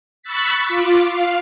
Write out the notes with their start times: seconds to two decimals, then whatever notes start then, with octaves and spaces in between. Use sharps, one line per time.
0.22 B5 C#6 E6 F#6 A6 B6
0.68 F4 D6
1.06 F5